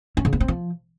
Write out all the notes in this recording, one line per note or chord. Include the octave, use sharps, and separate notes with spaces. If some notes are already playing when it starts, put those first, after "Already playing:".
C#4
C#3
B3
C4
F3